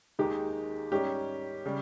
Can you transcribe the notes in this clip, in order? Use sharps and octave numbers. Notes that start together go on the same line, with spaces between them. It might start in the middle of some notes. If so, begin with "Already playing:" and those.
D#2 D#3 G#3 D#4 G4
G#2 G3 C#4 G4
C#3 G3